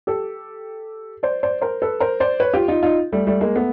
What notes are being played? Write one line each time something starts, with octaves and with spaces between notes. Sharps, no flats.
G4 A4
C5 D5
C5 D5
A#4 C5
A4 B4
A#4 C5
C5 D5
B4 C#5
F4 G4
D#4 F4
D#4 F4
G3 A3
G3 A3
G#3 A#3
A3 B3